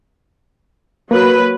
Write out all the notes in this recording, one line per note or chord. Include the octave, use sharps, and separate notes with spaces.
F#3 A#3 B4